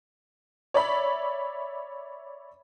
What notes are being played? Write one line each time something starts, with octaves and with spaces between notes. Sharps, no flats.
C#5 D5 E5 B5